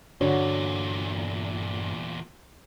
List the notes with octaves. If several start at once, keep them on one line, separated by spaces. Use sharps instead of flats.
E2 G2 A#2 D3 F#4 C#5